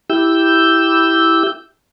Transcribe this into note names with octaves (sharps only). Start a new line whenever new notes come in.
E4 G4 E6 G6